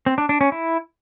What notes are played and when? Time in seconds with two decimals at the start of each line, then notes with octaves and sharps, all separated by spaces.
0.06 C4
0.18 D4
0.29 D4
0.41 C#4
0.52 E4